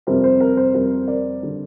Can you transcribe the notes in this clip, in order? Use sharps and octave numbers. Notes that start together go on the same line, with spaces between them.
F2 C3 G3 C4 A#4
C5
A#4
C5
F2 C3 G3 C4 A#4
A#4 D5
D3 G3